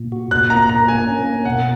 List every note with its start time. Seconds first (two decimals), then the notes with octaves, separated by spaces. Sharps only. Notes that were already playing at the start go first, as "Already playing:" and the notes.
Already playing: A#2
0.12 F#4
0.31 A#2 F#6
0.50 A#3 A#5
0.69 A#2 A#5
0.88 A#3 G#5
1.07 C#4
1.27 A#3
1.45 B2 F#5